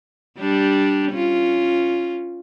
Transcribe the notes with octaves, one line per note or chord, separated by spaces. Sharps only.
G3 D4 G4
C#4 F4